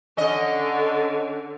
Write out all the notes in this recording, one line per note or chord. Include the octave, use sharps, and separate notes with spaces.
D3 C#4 D#5